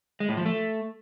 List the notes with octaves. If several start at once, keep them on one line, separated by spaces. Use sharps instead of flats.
G#3
A2
F3
A3